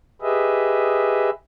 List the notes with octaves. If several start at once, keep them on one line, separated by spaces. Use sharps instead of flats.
G4 G#4 B4 D#5 E5